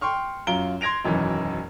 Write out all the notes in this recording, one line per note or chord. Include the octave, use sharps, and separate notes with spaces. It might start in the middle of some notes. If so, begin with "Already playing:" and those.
G5 C6 C#6 F6
F#2 F4 A#5 D7 G7
C6 G#6 A#6 D7 F7
E1 F#2 D#3 E3